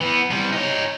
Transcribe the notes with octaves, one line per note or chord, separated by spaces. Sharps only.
E3 B3
C3 G3
D#4 C#5